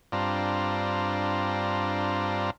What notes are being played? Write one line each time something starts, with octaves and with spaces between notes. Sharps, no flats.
G2 C4 D4 F4 A#5